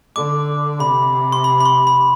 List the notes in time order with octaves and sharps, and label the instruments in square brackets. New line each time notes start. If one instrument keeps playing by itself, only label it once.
[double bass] D3 [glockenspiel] D6
[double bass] C3 [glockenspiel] B5
[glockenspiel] C6
B5
B5
C6
B5